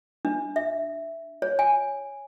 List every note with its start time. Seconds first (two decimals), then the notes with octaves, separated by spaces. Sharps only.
0.25 D4
0.56 E5
1.42 C#5
1.59 G#5